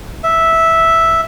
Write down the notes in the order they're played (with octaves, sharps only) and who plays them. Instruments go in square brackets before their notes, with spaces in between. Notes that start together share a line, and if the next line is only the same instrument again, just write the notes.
[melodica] E5